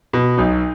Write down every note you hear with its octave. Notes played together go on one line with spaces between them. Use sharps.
B2
B1 D#4